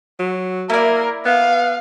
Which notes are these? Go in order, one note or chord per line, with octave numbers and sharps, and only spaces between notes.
F#3
A#3 E4 A#4 D5
B3 F5